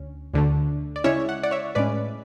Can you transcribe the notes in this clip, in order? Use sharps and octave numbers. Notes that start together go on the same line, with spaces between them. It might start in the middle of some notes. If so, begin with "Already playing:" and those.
Already playing: D2 C#4
D2 D3 A3
D5
C#3 G#3 C#4 E4 C#5 E5
F#5
D5 F#5
C#5 E5
A2 G#3 C#4 B4 D5